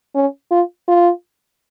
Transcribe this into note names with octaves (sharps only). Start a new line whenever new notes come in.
C#4
F4
F4